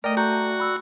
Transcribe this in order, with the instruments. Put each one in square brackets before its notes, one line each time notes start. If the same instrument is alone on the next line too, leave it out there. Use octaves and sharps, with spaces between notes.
[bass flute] A3 [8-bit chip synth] A#4 D#5 [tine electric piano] D5 G5
[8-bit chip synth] F#4 F#5 [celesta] A#5 F#6 G6
[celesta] B5 E6